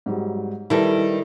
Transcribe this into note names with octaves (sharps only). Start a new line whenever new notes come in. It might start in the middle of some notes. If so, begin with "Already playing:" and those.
G#2 F#3 G3
D#3 G3 E4 A4 B4